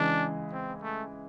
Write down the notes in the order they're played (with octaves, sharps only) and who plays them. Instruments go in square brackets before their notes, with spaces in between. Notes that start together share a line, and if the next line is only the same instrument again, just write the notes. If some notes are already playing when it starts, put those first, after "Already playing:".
Already playing: [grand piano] C#3 E3 G#3 [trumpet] D4
[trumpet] C4
A3